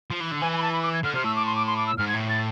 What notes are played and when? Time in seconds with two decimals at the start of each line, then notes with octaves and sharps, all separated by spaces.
0.11 F3
0.21 E3
0.31 D3
0.41 E3 G#5
0.52 G#5
0.58 B5
0.62 A5
0.73 B5
0.82 D6
0.93 G#6
1.04 D3 F6
1.14 C3 F6
1.24 A2 E6
1.36 D6
1.46 C6
1.56 D6
1.67 C6
1.77 D6
1.87 E6
1.98 G#2 F6
2.08 G#6
2.13 A2
2.30 A6